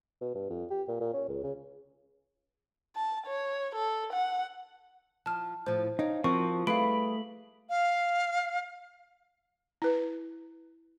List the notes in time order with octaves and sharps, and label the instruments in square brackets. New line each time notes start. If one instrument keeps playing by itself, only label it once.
[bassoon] B2
G2
F2
G4
A#2
A#2
C#4
C#2
C#3
[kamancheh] A5
C#5
A4
F#5
[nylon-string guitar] F3 [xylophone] A5 F6
[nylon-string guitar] A2 F3 [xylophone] C5
[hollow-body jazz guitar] D#4 [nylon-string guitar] C#5 F5 G5
[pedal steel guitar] F3 [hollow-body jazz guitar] C4 [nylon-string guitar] E4 F#4 A#4 [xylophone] C#6
[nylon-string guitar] G3 G#4 B4 [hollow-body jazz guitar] A3 [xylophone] F5 D7 [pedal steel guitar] B5
[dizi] F5
[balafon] E4 B4